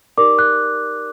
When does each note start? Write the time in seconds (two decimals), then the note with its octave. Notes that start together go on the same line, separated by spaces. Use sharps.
0.18 D#4 G4 A#4 D5 D6
0.39 F#6